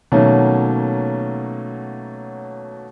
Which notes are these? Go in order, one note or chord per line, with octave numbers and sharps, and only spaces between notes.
B2 D#3 F#3 A3 A#3 C#4